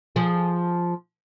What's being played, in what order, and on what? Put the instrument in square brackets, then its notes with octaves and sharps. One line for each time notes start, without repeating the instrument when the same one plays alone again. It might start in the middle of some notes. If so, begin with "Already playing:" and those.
[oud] F3 G#4